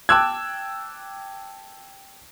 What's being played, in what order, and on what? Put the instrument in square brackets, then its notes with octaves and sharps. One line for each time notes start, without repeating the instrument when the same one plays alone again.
[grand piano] G5 A5 D6 E6 F#6 G#6